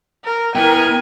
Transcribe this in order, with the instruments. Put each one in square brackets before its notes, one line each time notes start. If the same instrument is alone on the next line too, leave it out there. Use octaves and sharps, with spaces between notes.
[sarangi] A#4
[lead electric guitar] B3 E4 [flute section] A#4 [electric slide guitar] G5 [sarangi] G#5